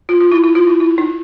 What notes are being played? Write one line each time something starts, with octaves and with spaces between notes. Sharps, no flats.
F4
F4
E4
E4
F4
E4
E4
D#4